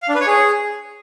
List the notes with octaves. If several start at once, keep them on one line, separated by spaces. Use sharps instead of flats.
F5
D4
B4
C#5
G#4